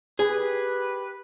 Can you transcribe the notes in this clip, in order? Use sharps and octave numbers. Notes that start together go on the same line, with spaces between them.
G4 G#4 B4